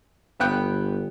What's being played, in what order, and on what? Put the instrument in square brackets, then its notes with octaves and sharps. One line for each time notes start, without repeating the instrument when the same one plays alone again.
[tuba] G1 [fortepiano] B3 G5 F#6